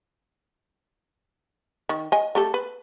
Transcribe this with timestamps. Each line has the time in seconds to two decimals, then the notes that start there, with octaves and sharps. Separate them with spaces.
1.89 D#3
2.12 D#5 G#5
2.35 A3 G4 A4
2.54 B4